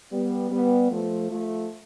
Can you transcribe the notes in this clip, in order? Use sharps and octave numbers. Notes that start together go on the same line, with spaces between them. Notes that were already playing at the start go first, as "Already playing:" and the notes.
G3 B3
G3 B3
F3 A3
F3 A3